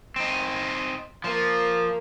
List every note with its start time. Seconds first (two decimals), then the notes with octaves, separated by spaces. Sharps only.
0.16 C4 D#4
1.24 F3 A#3